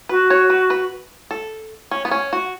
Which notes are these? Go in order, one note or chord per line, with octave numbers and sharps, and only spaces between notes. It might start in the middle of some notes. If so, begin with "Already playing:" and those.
F#4 B4
C#5
B4
B4
A4
C#4
B3
C#4
F#4